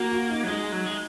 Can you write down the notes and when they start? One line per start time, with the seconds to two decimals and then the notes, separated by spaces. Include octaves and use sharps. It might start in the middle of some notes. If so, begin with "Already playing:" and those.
Already playing: A#3 F#4
0.12 F#4
0.30 D#4
0.44 F#3
0.48 G#3 D#4
0.72 F#3
0.86 G#3